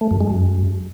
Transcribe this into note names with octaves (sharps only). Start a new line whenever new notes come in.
A3
F#2
G#3
F#2